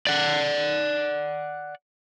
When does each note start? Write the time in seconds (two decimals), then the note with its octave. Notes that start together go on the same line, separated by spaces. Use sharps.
0.07 D5 F#5